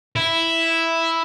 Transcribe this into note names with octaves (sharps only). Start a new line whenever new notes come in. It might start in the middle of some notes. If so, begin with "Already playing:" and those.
E4